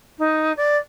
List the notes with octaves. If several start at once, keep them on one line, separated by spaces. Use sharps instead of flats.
D#4
D5